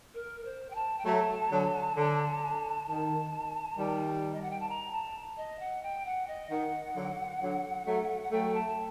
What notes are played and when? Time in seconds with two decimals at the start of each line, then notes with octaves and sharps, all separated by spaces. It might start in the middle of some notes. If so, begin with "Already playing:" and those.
0.14 A#4
0.45 C5
0.70 G5
0.75 A5
0.98 G5
1.05 F#3 A3 A5
1.51 D3 F#3
1.96 D3
2.87 D#3 A5
3.77 D#3 G3
4.33 D#5
4.42 F#5
4.51 G5
4.60 A5
4.69 A#5
4.92 A5
5.37 D#5
5.60 F#5
5.83 G5
6.06 F#5
6.27 D#5
6.50 D#3 F#5
6.95 D3 F#3
7.41 D3 F#3
7.86 F#3 A3
8.22 F#5
8.32 F#3 A3 G5
8.54 A5